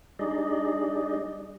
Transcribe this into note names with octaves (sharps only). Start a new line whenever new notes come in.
G3 D4 D#4 G#4 D5 D#5